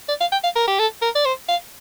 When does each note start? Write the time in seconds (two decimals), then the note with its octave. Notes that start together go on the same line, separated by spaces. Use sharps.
0.09 D5
0.21 F5
0.32 G5
0.44 F5
0.56 A#4
0.67 G4
0.79 A4
1.02 A#4
1.15 D5
1.25 C5
1.49 F5